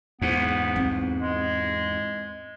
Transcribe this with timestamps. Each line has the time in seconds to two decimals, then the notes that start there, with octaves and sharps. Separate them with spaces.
0.22 E2 G#2 B3
0.76 C4
1.20 G#3